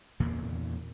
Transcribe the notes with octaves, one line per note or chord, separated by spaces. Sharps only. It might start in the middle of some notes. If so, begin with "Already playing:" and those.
E2 A#2 C#3 A#3